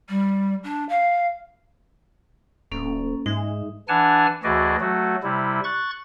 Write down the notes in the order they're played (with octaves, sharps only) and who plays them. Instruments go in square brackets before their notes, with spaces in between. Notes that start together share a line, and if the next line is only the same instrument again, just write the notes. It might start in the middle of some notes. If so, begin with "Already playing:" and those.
[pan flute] G3
D4
F5
[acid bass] D1 [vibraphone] A#3 C#4 A4
[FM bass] G#2 [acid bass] G#3 [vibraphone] D#4 E5
[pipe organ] E3 D4 F#5 G#5 A5 F6
D2 E3 F#4 G#4 D5 D#5
F#3 A3 F#4
C3 G3 E4
C#6 F#6 A6